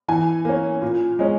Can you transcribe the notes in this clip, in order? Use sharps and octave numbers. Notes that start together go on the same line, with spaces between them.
E3 G#5
A#3 C#4
A#2
G#3 C#4